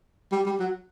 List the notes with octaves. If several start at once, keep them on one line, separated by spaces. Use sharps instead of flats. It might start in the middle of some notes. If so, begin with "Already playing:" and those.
G3
G3
F#3